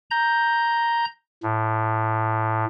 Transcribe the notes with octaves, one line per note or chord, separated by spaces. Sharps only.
A#5 G6
A2